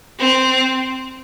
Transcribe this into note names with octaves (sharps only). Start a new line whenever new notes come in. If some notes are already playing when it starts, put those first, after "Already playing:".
C4